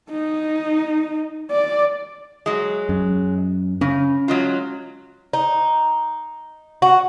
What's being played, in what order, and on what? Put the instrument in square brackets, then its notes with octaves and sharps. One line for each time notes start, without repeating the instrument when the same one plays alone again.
[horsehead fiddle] D#4
D5
[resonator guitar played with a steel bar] F#3 G#3
[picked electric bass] F#2
[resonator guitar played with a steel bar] C#3 [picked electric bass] C#4
[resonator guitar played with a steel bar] F#3 G#3 F4
[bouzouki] D#4
F#4